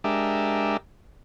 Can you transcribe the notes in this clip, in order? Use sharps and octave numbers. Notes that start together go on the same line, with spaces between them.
G#3 D4 G4 A#4 E5